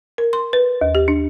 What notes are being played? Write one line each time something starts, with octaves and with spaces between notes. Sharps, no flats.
A#4
C6
B4
D#2
G4
D4